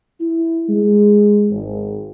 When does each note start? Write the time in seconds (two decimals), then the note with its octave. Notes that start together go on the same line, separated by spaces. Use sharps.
0.21 E4
0.69 G#3
1.50 G#1